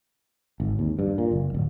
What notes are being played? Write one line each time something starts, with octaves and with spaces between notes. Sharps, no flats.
G#1
D#2
G2
A#2
F#1
D1